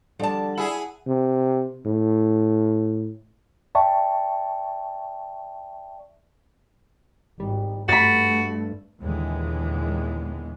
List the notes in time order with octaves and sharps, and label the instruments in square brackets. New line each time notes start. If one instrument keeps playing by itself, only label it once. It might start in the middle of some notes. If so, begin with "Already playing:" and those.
[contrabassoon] D3 [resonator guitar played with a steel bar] F3 A5 [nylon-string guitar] G3 D5
[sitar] E4 G#4 [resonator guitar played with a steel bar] F#5
[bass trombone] C3
A2
[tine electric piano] D5 E5 G5 A5 C#6
[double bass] G#1 [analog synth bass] G3
[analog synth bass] G2 [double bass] A3 [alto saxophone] F#4 [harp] B5 A6
[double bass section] D#2 A#2 D3 E3 G#3 B3